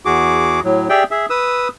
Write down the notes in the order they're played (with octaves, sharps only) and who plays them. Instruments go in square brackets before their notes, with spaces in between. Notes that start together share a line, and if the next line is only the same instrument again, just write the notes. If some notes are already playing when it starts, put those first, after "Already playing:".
[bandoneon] E2 F#4 G#4 D6
A2 F#3
G4 G#4 D5 E5 G5
G#4 E5
B4 D#6 E6